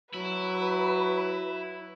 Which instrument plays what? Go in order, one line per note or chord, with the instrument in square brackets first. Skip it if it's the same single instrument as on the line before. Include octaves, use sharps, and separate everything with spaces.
[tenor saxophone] F#3 [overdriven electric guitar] E4 [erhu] B4